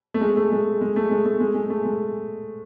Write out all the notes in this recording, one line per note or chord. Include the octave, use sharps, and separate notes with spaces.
A3
G#3
A3
G#3
G#3
A3
G#3
A3
G#3
G#3
A3
G#3